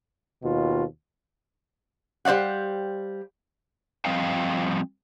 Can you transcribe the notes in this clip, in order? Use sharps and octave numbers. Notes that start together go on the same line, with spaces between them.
D#2 B2 F4
G3 C5 D5 F5 F#5
F3 G3 C4 D#5 F5 G5